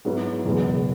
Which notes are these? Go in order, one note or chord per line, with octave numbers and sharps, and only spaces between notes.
G#2 F#3 B3 E4
F#1 E2 B2 G#3 B3